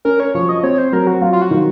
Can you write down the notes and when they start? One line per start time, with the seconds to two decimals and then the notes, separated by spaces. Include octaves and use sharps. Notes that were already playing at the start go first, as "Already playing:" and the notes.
0.05 C#4 A#4
0.20 C#5
0.35 F3 C#5
0.49 D#5
0.63 C4 C#5
0.78 C5
0.92 F#3 A#4
1.07 F#4
1.21 F#3 F4
1.33 F4
1.42 F#4
1.51 D#3